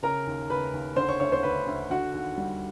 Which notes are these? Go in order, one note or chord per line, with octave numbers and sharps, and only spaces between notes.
C#3 A#4 A#5
D#2
C#3 B4 B5
D#2
D3 C5 C6
C#5 C#6
D2 C#5 C#6
C5 C6
D2 B4 B5
D2
D3 F#4 F#5
D#2
G3